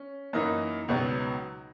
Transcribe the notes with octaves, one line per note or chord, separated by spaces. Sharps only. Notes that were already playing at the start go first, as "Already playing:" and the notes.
Already playing: C#4
F#2 E3 A#3 D#4 D#5
C#2 B2 F#3 B3